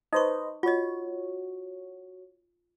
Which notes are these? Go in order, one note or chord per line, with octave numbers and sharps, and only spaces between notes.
D#4 B4 C5 D#5 C#6
F4 F#4 C#5 D#5